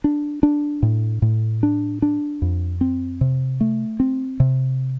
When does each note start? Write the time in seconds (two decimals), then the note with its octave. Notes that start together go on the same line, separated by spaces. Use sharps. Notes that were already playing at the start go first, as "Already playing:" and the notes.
0.04 D4
0.43 D4
0.83 A2
1.22 A2
1.63 D4
2.02 D4
2.42 F2
2.81 C4
3.21 C3
3.61 A3
4.00 C4
4.40 C3